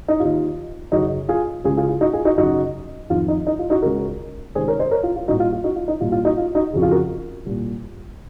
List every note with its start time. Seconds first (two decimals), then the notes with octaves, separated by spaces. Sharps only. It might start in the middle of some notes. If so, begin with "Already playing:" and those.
0.08 D#4
0.20 D#2 D#3 F4
0.92 F#2 C#3 D#4 F#4
1.29 F4 G#4
1.64 C#2 C#3 F4 G#4
1.77 F4 G#4
1.89 F4
2.01 D#4 F#4
2.13 F4 G#4
2.25 D#4 F#4
2.37 F#2 C#3 D#4 F#4
3.10 F2 D#3 F4
3.28 D#4
3.47 D#4
3.59 F4
3.70 D#4 F#4
3.82 C#2 C#3 F#4 A#4
4.55 C#2 C3 D#3 G#4 C5
4.67 A#4 C#5
4.79 C5 D#5
4.91 A#4 C#5
5.03 F4
5.16 F4
5.28 C2 D#4 F#4
5.31 A#2
5.40 F4
5.52 F4
5.64 D#4 F#4
5.76 F4
5.88 D#4
6.01 C2 A#2 F4
6.12 F4
6.24 D#4 F#4
6.37 F4
6.55 D#4 F#4
6.73 F2 C#3 F#4
6.82 F4 G#4
6.91 F#4 A#4
7.46 C2 A#2